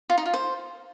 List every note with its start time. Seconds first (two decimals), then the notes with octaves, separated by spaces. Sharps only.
0.10 F4
0.18 D#4
0.26 F4
0.34 C5